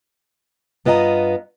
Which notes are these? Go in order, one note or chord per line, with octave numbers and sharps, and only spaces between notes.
G2 B3 F4 D#5 G#5 A#5